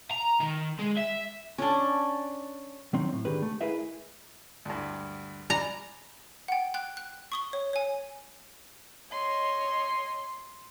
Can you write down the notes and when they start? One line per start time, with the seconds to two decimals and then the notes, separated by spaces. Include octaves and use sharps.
0.11 A#5
0.40 D#3
0.79 G#3
0.97 E5
1.58 C#4 D4
2.93 D#3 F#3 C4 D#4
3.12 A2
3.25 D3 D#3 G4 G#4 B4
3.42 A3
3.61 E4 G#4 A#4 B4 D#5 E5
4.65 D2 G2
5.50 D5 G#5 A#5 B5
6.48 F#5 G5
6.74 G5 F#6
6.97 F#6
7.32 C#6 D#6 G7
7.53 C#5
7.73 C#5 G#5
9.11 C#5 D#5 C6